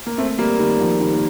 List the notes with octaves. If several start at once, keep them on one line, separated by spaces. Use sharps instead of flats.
A#3
A3 C4
G3 A#3
D#3 G3
F3
D#3 G3
A#3